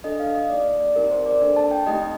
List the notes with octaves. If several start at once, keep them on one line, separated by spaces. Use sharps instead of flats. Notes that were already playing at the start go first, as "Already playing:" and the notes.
D4 A4 D#5
F5
D#5
A#3 D#4 G4 D5
D5
D5
C4 D#4 G4 A#4
C5
D5
A#3 D4 A4
A5
G5
A3 C4 D#4 G4 D#5